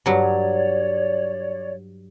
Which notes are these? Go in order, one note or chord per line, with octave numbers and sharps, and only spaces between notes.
G2 F#3 C#5 D5